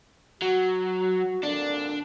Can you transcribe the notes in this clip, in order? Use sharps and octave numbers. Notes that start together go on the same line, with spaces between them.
F#3 F#4
G#1 A#2 D3 D4